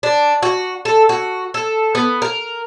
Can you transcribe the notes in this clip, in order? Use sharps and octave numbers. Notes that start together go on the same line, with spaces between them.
D4
F#4
A4
F#4
A4
B3
A#4